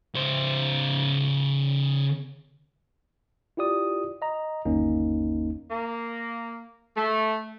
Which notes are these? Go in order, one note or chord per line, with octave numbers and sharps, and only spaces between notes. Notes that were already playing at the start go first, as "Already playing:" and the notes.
C#3 C5
E4 F4 G4 D5 D#6
D#5 A#5
G1 D#2 A#3 C#4 D#4
A#3
A3